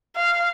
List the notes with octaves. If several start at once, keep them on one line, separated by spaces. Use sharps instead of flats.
F5